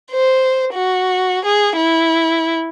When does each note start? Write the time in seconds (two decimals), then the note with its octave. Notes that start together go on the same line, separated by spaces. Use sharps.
0.12 C5
0.73 F#4
1.45 G#4
1.77 E4